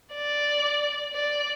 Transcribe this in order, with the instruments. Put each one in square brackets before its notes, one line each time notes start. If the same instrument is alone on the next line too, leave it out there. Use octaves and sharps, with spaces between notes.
[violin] D5
D5